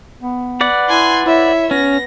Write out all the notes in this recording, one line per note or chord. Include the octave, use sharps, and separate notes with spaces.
B3
B4 D5 F#5
E4 G#5 C6
E4 C#5 E5
B3 C#4 A#6